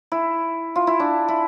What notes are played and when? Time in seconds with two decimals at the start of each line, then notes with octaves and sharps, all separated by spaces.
0.12 E4
0.76 F4
0.87 E4
1.00 D4
1.28 E4